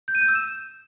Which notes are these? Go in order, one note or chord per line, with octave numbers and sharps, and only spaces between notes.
G6
D#7
G6
E6
E7